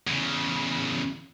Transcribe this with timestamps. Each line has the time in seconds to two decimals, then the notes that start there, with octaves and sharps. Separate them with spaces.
0.07 E2 C#3